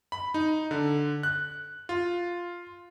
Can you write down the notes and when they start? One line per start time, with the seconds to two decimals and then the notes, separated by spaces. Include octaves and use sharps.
0.12 B5
0.34 D#4
0.71 D3
1.23 F#6
1.89 F4